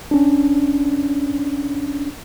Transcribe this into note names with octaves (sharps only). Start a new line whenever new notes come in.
C#4 D4